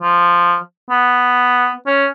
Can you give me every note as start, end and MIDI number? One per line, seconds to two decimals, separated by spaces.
0.03 0.57 53
0.91 1.73 59
1.87 2.06 61